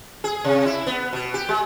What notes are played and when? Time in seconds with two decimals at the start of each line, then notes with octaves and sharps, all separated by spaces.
0.24 G#4
0.44 C3
0.66 E4
0.87 B3
1.13 B2
1.34 G4
1.49 G#3